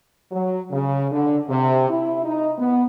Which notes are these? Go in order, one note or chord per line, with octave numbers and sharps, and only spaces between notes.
F#3
C#3
D3
C3
E4
D#4
B3